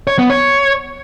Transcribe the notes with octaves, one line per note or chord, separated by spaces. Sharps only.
C#5
B3
C#5